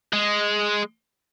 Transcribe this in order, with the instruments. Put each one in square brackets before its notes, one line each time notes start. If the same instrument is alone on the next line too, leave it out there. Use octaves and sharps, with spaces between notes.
[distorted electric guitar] G#3